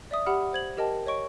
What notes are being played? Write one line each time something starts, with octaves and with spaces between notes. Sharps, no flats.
D5 E5 D#6
G4 F#5 B5 D#6 F6
C5 G#6 F#7
G4 A#4 D#5 G5 A5
C#5 D#5 C#6 D7